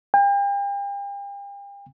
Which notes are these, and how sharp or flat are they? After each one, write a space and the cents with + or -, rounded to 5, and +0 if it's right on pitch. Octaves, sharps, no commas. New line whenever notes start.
G5 +40